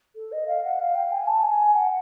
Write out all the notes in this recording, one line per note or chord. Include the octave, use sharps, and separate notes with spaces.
A4
D#5
F5
F#5
F5
G5
G#5
A5
G#5
F#5